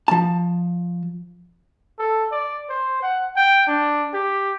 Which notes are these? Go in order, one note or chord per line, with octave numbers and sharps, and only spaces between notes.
F3 A5
A4
D5
C5
F#5
G5
D4
G4